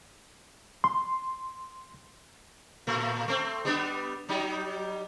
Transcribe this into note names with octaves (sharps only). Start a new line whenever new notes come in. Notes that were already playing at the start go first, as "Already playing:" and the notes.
C6
A2 A3
A3 C4
G3 B3 D4
F#3 G3 D#4